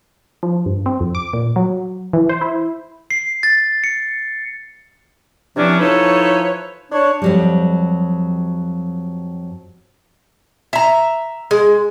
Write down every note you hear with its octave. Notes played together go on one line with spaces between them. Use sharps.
F3
G2
C4
F2
D6
A#2
F#3
E3
C5
E4
C7
A6
C#7
C3 E3 F3 C#4 D4
E3 F3 D#4 A4 B4 C#5
D4 C#5
F2 F#3 G3
E5 A#5
G#3